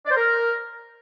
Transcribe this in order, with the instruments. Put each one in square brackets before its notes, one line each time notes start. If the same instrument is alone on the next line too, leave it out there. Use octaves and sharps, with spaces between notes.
[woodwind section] D5
C5
A#4